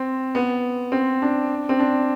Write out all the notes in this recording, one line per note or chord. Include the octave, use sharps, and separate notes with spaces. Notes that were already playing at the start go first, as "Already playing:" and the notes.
Already playing: C4
B3
C4
D4
C4
D4